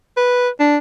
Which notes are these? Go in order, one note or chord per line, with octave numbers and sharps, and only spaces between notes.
B4
D4